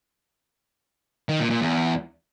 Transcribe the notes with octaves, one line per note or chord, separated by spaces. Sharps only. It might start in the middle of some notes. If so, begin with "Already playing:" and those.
D#3
A#2
A#2
E2